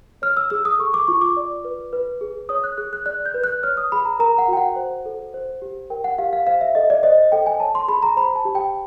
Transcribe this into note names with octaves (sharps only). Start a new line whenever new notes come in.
C#5 F6
E6
G#4 E6
D#6
A4 C#6
D6
F4 C#6
D6
D5
B4
B4
G#4
C#5 D#6
F#6
G#4 F#6
F#6
D5 F#6
G6
B4
F#6
C#5 F6
D#6
G#4 B5
A#5
A#4 A#5
F#5
F#4 G5
F#5
C5
A4
C5
G4
A#4 G5
F#5
G4 F5
F5
C5 F5
E5
A4 D#5
D5
C5 D#5
D#5
A4 G5
G#5
C#5 A5
C6
G#4 B5
A#5
C5 B5
A5
G4
G5